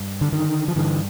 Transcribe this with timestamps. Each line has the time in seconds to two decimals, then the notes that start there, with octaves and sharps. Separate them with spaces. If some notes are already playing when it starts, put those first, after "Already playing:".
Already playing: G2
0.21 D3
0.32 D3 D#3
0.68 F3
0.76 G2 D3 E3